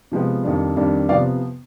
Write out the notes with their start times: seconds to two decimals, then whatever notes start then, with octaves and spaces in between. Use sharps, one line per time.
0.12 C3 F3 G#3 B3
0.44 F2 D#3 G3 D4
0.77 F2 D#3 G3 D4
1.09 C3 F3 B3 D5 F5